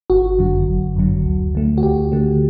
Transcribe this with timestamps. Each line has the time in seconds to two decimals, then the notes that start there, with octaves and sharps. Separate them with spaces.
0.10 G1 F#4
0.39 F#2 D3 F#3
0.68 G1
0.96 F#2 D3 F#3
1.26 D2
1.55 D3 A3
1.78 F#4
1.83 D2 G4
2.12 D3 A3